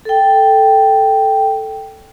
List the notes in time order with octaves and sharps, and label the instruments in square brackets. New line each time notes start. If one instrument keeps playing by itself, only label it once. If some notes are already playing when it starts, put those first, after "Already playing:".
[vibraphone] A4 G5